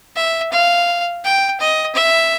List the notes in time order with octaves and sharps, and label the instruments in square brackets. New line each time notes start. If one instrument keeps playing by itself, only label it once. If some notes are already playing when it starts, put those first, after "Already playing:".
[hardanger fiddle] E5
F5
G5
D#5
E5